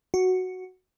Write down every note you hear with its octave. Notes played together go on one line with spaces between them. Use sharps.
F#4